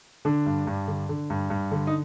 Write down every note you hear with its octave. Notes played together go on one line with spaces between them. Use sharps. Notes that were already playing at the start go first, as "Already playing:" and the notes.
D3 D4
G2
G2
D3
D3
G2
G2
D3
D#4